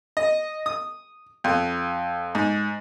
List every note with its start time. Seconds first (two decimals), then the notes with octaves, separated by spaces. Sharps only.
0.17 D#5
0.66 D#6
1.44 F2
2.35 G#2